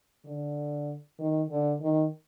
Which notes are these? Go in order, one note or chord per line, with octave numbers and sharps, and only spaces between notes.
D3
D#3
D3
D#3